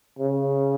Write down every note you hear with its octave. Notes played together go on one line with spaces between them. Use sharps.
C#3